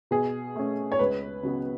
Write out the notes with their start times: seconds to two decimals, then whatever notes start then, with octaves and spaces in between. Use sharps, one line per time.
0.11 B2 G#4
0.56 A3 C#4
0.92 C#5
0.99 C#2 B4
1.43 C#3 F#3 B3